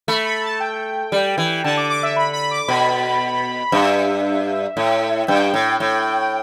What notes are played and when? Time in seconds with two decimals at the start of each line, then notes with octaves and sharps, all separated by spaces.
0.08 A3 B5
0.25 B5
0.43 A5
0.60 G5
1.12 G3
1.38 E3
1.64 D3 A5
1.77 D6
1.90 D6
2.03 E5
2.16 B5
2.33 B5
2.51 D6
2.68 B2 B5
3.72 G2 E5
4.77 A2
5.28 G2 G5
5.54 A2
5.80 A2